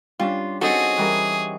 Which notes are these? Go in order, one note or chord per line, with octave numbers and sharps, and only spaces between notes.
G3 C#4 D4 F4
C4 C#4 D#4 F#4 G#4 A4
E3 G3 A#4